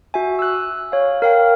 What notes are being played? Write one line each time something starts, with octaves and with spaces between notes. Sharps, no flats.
F#4 E5 G#5
E6 F#6
C#5 F5
A#4 F5 G5